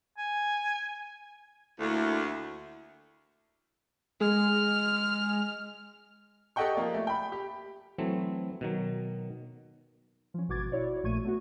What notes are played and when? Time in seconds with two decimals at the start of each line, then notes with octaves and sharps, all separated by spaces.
0.17 G#5
1.80 D2 A3 A#3 E4
4.21 G#3 F6
6.56 G4 A4 D#5 F#5 G5 C#6
6.75 F3 A#3 D5
6.94 A3
7.07 G5 B5
7.32 G4
7.98 E3 F#3 A3 C4
8.61 B2 D#3 F#3
10.34 F3 C#4
10.48 G#1 B2 F#4 D6 G#6 A6
10.72 E4 F#4 C#5 D5
11.03 A#1 A#2 A3 C#6 G#6 D#7
11.24 A3 B3 F#4